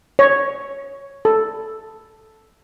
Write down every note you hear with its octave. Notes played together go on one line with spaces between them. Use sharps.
C#5
A4